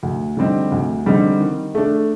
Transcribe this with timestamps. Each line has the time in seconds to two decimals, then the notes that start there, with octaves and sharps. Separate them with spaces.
0.03 D2
0.37 D3 G3 C4 D#4
0.72 D2
1.06 D3 G3 C4 D#4
1.40 D#3
1.75 A3 D4